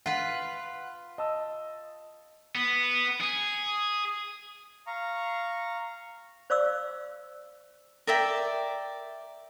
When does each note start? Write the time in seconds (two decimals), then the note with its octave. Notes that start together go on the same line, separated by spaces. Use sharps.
0.06 F4 B4 F#5
1.18 D#5 A5 E6
2.55 B3
3.21 G#4
4.87 F5 A#5 C#6
6.50 C5 D5 F5 D6 E6
8.07 A#4 D5 E5 G5